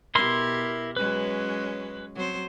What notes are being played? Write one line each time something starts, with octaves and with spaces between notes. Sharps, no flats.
B2 E4 G4 A#4 C6
F#3 G#3 C#4 B4
F#3 C4 C5